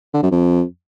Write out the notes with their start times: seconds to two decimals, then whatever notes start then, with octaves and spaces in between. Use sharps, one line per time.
0.14 D3
0.23 F#2
0.31 F2